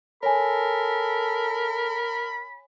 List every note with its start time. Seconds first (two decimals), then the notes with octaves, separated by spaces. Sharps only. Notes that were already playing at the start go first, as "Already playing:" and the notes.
0.23 A4 A#4 C#5 G#5 B5